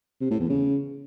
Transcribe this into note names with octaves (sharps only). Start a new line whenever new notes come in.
C3
A2
E2
C#3